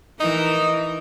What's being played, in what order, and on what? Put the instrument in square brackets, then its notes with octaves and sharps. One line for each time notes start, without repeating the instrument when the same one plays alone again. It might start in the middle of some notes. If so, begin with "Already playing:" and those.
[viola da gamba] E3 A#4 [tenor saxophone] D#4